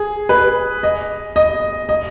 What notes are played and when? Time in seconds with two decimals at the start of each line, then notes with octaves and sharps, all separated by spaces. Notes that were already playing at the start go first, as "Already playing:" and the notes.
Already playing: G#4
0.29 B4
0.83 D#5
1.36 D#5
1.89 D#5